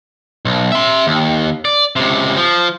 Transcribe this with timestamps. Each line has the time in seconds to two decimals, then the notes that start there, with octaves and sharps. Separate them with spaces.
0.45 B1
0.72 E5 C6
1.07 D#2
1.65 D5
1.96 C#2 C3
2.37 F3